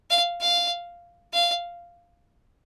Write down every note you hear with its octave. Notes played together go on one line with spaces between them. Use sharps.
F5
F5
F5